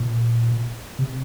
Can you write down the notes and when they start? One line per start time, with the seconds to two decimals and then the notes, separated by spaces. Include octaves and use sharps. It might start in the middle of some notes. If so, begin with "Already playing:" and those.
Already playing: A#2
0.99 C3